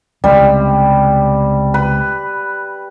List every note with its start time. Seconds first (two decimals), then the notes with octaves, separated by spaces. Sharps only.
0.24 C#2 C3 G3
1.74 B4